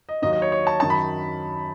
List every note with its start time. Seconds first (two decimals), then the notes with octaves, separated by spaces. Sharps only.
0.09 D#5
0.22 D#2 D#3 F#3 D#5
0.33 D#5
0.42 C#5
0.52 C#5
0.67 A5
0.80 F#2 D#3 F#3 A5
0.90 B5